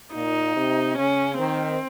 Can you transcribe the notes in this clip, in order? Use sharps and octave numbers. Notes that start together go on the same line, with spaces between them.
A#2 D#4
C3
C#3 C#4
D#3 C4